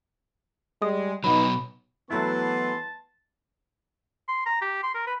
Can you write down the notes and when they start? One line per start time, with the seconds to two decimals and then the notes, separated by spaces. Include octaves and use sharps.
0.82 G3 G#3 D#6
1.24 B2 F#3 B3 D#4 B5
2.11 E3 F#3 A3 B3 E4 A5 C6
4.28 C6
4.46 A#5
4.61 G4
4.83 C6
4.94 A#4
5.07 B4